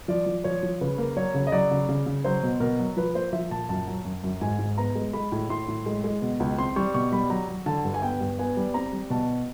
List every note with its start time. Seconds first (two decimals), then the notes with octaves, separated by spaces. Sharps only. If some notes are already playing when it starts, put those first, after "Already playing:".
0.08 F3 D5
0.26 F3
0.44 F3 C#5
0.63 F3
0.81 C#3 B4
0.98 A#3
1.16 F#3 C#5
1.34 C#3
1.47 D#5
1.52 F#3 D5
1.71 C#3
1.89 C#3
2.06 C#3
2.24 F#3 C5
2.43 B2
2.60 B2 A#4
2.79 F#3
2.97 F3 B4
3.15 A#3 C5
3.33 F3 E5
3.51 A#2 A5
3.69 F#2 A5
3.88 F#3
4.05 F#2
4.24 F#2
4.41 G#2 G#5
4.59 G#2
4.78 B3 A#5
4.95 G#3
5.13 G#3 B5
5.32 A2
5.50 A2 C6
5.68 A2
5.86 G#3
6.04 G#3
6.22 B2
6.40 C#2
6.58 C4 C6
6.76 G3 C#6
6.94 B2 C#6
7.12 G3 B5
7.30 F#3 A#5
7.48 F#3
7.66 D3 A5
7.85 G2
7.94 G#5
8.02 B3 G5
8.21 G2
8.39 B3 G#5
8.57 G3
8.74 C4 A#5
8.93 G3
9.10 B2 A5